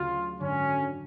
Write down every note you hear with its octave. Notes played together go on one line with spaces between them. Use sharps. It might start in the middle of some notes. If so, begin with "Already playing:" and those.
Already playing: D2 C#3 F#3 F4
G#1 F#2 D3 F#3 C#4